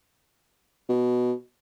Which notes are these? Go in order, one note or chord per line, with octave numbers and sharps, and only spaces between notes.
B2